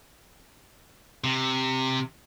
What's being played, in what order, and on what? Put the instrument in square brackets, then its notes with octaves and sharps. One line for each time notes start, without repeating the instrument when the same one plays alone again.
[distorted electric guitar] C3